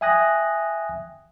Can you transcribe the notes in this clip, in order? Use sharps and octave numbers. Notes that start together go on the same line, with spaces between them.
E5 G5 G#5 D#6 F#6 A#6